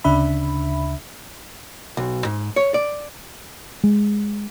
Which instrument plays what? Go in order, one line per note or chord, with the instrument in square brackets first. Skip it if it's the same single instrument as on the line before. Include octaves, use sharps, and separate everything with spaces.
[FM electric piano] D2 C#3 D4 E5 B5
[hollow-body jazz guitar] B1
G#2
C#5
D5
[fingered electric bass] G#3